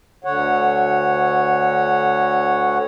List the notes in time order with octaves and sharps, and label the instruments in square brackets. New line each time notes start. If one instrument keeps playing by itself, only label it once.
[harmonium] D2 D3 C#5 F#5